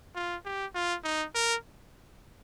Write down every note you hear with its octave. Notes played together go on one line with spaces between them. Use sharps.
F4
G4
F4
D#4
A#4